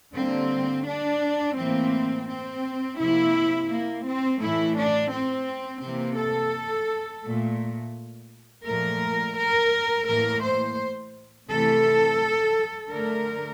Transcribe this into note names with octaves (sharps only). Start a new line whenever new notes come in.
D3 G3 A#3 C4
D4
A2 E3 A#3 C4
C4
C3 F3 A#3 E4
A#3
C4
A2 E3 A3 E4
D4
C4
C3 E3 A#3 C4
A4
A#2 A3
A#2 F3 A3 A#4
A#4
A2 E3 A#3 A#4
C5
C3 E3 A3 A4
D3 A3 A#4